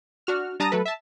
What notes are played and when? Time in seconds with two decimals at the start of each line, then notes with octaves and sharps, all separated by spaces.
0.27 D4 F#4 F6
0.60 G3 D4 A5 A#5 D#6 D#7
0.72 F#3 A3 A4 B4
0.85 E5 A5